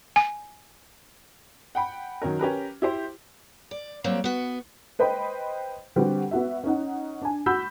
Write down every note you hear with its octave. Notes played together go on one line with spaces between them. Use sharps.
G#5
F#5 G5 B5
D#3 F#3 C#4 A#4
C#4 G4 A#4 B4
E4 G4 C5
D5
F#3 G3 A#3 C4
B3 F#4
B4 C5 D#5 G5 B5
D3 G3 C4 F#4 G4 B4
B3 F#4 E5
C#4 D#4 F#5
D4 G#5
F#4 B5 E6 G6 B6